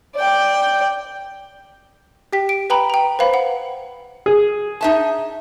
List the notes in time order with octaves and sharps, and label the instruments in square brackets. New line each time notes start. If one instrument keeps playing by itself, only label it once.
[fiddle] D5 G5
[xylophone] G4 G5 B6
D7
B4 G5 A#5 B5
G5 A#5
B4 C5 F5 B5
F#5
[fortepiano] G#4
[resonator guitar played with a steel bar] D#4 E5 A5